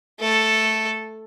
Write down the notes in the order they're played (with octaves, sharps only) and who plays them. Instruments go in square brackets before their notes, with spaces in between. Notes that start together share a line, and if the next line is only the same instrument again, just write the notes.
[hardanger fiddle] A3 A4